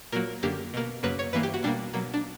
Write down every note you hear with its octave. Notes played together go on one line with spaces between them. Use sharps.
A#2 F#3 A#3 A#4
F#2 D3 A#3 G4
B2 A#3
F#2 C#3 F#3 A#3 B4
C#5
G2 E3 A#3 B4
G4
F#4
B2 G3 A#3 D4
B2 F#3 A#3
D4